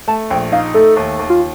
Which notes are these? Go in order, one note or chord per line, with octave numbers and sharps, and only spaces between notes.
A3 A5
A#1 G5
D#4 F5
A3 A4
D#2
D#2
F4